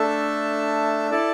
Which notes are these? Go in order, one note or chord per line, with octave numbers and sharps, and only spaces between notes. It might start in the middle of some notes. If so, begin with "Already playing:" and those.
Already playing: A3 D4 A4 E5 A5
E4 A4 D5 A5